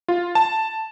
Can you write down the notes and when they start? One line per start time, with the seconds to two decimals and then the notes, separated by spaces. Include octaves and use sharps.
0.08 F4
0.35 A5